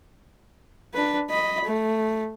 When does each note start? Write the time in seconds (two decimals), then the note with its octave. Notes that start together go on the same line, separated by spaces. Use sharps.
0.94 D4 B4
1.30 D#5 B5
1.65 A3